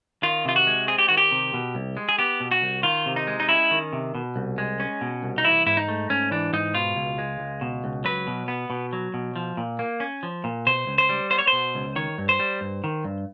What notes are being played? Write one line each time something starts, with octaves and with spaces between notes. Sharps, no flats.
D#3 F4
C3 F4
F#4
G#3
C4 G#4
G4
D#3 F#4
G4
C3
B2
C2
G#3
G#4
B3 G4
B2
F#4
C2
D#3 F4
C3
D#4
G#3
D#4
C#4 E4
D#3
C3
B2
C2
G#3
C#4
B2
C2
D#4
E3 E4
G#2 E4
D#4
A3
G#2 C#4
E3 D4
G#2 D#4
B2 F4
C#2
G#3
C#2
B2
C#2
F#3 B4
B2
B3
B2
F#3
B2
F3
A#2
A#3
C#4
F3
A#2
B2 C5
C#2
C5
G3
B3 C5
C#5
B2 C5
C#2
D#3 C#5
G2
C5
G3
G2
D#3
G2